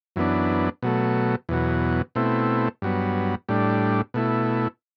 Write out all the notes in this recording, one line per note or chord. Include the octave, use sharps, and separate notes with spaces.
F#2 E3 B3 D4
B2 F#3 A3
E2 B2 F#3
B2 A3 C4 E4
G2 F#3 B3
A2 G3 D4
B2 A3 E4